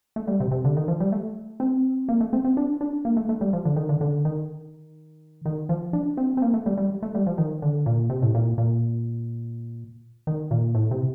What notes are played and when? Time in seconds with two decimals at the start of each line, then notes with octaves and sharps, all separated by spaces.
0.16 A3
0.27 G3
0.40 C3
0.51 C3
0.65 D3
0.77 D#3
0.88 F3
1.00 G3
1.12 A3
1.60 C4
2.09 A#3
2.21 A3
2.33 C4
2.44 C4
2.57 D4
2.81 D4
3.05 A#3
3.17 A3
3.29 A3
3.41 G3
3.53 F3
3.65 D3
3.76 D#3
3.89 D3
4.01 D3
4.25 D#3
5.46 D#3
5.69 F3
5.93 D4
6.17 C4
6.37 C4
6.42 A#3
6.54 A3
6.66 G3
6.78 G3
7.03 A3
7.15 G3
7.27 F3
7.38 D#3
7.62 D3
7.86 A#2
8.10 C3
8.22 A2
8.35 A#2
8.58 A#2
10.27 D#3
10.51 A#2
10.75 A2
10.91 C3